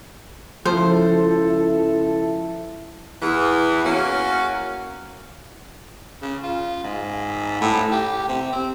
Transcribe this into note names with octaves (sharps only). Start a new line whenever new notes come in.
C#2 F3 E4 A4 C5
E2 E3
A#3 C#4 F#4
C#3
F4
G#2
A2
G4
C3
C4